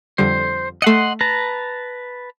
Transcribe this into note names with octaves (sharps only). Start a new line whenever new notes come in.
F2 D3 G3 C5
A3 D#5 F#5 C6 C#7
B4 A5 A#5